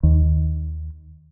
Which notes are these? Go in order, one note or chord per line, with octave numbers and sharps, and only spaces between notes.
D#2